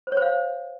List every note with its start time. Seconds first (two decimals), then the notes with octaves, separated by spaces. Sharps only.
0.07 C5
0.12 C#5
0.17 C5
0.22 F5